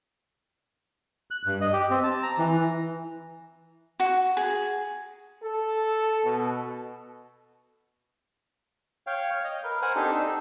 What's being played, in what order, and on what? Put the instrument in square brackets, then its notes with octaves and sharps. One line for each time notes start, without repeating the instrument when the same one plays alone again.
[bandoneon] F#6
G2
D#5
G4
C4
A5
A#5
E3
[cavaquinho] F#4
G#4
[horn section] A4
B2
[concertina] C#5 F5 G5
D#5
A#4 B4
A#4 C5 F#5 G#5
C4 D4 D#4 G4 A4
D#4 E6